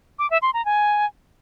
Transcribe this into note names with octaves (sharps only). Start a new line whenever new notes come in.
D6
E5
C6
A#5
G#5